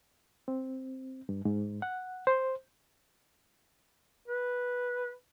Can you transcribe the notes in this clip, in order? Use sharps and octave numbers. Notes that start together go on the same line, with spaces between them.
C4
G2
G#2
F#5
C5
B4